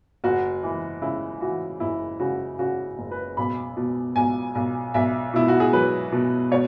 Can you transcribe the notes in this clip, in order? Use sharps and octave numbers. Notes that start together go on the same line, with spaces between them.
F#1 F#4
E3
C#3 E4
E3 F#4
F#1 E4
C#3 F#4
C#3 F#4
F#1
B4
B1 B5
B2
B1 G#5
B1
B1 E5
B2 E4
F#4
G#4
F#3 B4
B2
B2 C#5